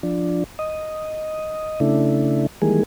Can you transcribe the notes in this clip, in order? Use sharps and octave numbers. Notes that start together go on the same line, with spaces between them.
F3 D4
D#5
C#3 A3 D4 E4
D#3 E3 G3 G#3 A#3 G#4